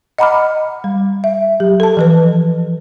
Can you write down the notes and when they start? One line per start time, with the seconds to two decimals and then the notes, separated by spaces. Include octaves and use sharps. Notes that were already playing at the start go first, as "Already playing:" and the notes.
0.18 D#5 F#5 A#5 B5 D6 F6
0.84 G3
1.24 E5
1.60 F#3 G4
1.80 A4 A5
1.97 E3 F3 B4